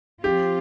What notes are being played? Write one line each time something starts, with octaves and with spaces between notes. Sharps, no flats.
F3 C4 F4 G4